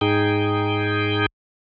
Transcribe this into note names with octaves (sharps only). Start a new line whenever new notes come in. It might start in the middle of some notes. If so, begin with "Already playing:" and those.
G#2 D#4 G#4 G5